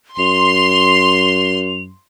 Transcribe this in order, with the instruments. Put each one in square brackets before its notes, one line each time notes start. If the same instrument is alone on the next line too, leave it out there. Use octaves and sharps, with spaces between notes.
[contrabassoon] F#2 [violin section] C6 [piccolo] F7